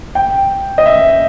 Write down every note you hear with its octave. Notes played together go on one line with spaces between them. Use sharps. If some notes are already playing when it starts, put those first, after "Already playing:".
G5
D#5
E5